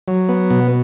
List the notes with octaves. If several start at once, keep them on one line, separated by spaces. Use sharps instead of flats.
F#3
B3
B2